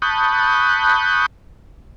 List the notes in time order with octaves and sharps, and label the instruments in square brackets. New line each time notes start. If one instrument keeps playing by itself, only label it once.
[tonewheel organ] A5 B5 C#6 D#6 F#6 G6